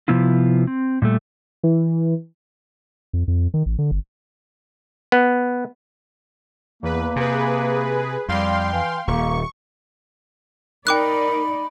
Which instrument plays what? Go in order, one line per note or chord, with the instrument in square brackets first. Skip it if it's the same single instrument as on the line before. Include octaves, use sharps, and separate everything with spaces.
[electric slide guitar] C3 F3 B3 E4 F4
C4
A#2 G3 A3
[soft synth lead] E3
[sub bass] F2
F2
D#3
A1
D3
G1
[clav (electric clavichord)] B3
[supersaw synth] E2 B4 [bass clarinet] A#3
[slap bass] C3 [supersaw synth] G#4 B4
[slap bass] F2 [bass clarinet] G3 [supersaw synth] F5 G5 C6
[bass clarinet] E3
[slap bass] D#1 [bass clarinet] A#3 [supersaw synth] C#6
[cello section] D#4 D5 [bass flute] A#4 [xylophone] G5 D6 F#6 [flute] B5